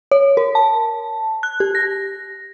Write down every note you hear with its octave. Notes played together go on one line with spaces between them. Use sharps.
C#5
A#4
A5
F#6
G4
A#6